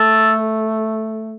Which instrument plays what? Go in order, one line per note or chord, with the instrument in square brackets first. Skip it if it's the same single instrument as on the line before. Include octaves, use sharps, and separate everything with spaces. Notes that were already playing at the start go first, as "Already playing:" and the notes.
Already playing: [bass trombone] A3 [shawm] A4